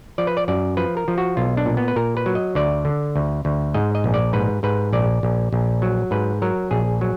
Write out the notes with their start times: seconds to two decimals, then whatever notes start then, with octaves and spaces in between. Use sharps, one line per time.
0.18 F3 D5
0.27 B4
0.37 D5
0.48 F#2 D5
0.77 F3 B4
0.97 A#4
1.08 F3
1.18 F#4
1.37 B1 F4
1.57 D4
1.66 A#2
1.77 B3
1.88 B4
1.96 A#2 A#4
2.17 B4
2.26 F#3
2.35 D#5
2.55 D2 D5
2.85 D3
3.16 D2
3.45 D2
3.74 G#2 D#5
3.95 D#5
4.04 A#1
4.14 D5
4.33 G#2 B4
4.63 G#2 B4
4.93 A#1 D5
5.23 A#1
5.53 A#1
5.82 F#3
6.11 G#2 B4
6.42 F#3 A#4
6.71 A#1 G#4
7.01 F#3